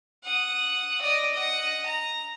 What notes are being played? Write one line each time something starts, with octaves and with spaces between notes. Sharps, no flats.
F#5 D#6
D5 D#5
D#5 F#5
A#5